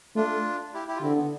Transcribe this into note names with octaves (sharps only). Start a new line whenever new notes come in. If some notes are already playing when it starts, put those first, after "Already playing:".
A3 D4 F4
E4 G4
E4 G4
F4
D3 C4 E4
B3